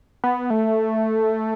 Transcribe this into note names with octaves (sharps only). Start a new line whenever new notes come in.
B3
A3